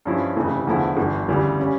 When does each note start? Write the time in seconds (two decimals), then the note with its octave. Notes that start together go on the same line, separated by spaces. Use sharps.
0.05 G2 F3 C#4 E4
0.36 F1 F2 C#3 E3 A3
0.67 E2 D3 F3 A3 E4
0.97 G1 G2 E3
1.29 D2 C#3 E3 G3
1.60 C#3 G3 C#4